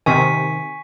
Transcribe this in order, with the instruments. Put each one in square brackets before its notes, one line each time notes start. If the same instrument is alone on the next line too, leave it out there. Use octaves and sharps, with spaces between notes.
[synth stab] C3 D#3 [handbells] G#5 C#6 B6